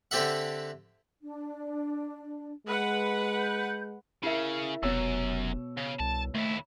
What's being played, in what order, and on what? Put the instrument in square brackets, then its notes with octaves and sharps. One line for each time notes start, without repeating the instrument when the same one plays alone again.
[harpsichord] D3 C4 G4 A4 E5 F#5
[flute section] D4
[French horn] G#3 [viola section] B4 F#5
[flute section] G6
[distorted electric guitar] C#3 [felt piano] E4 A#4 E5
[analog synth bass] F1 [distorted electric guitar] F#2 [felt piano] B2 C#5 E6
[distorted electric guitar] C#3
[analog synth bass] C2 [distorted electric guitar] A5
[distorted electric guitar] D#2 E4 [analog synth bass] A3